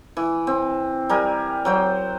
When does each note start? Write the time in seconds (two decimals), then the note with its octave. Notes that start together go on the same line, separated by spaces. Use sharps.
0.17 E3
0.47 C4
1.09 G3 A#4 G#5
1.65 F#3 C5 G5